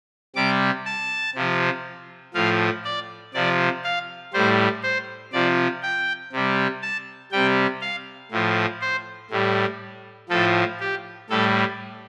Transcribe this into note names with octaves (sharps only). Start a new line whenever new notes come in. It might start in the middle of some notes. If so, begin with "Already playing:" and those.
C3 G3 D6
A5
C3 F3
A2 F3 F5
D5
C3 F3 D5
F5
A2 G3 C5
C5
C3 F3 D5
G5
C3 G3
A5
C3 G3 G5
F5
A2 F3
C5
A2 G3
A2 F3 A4
G4
A2 G3 A4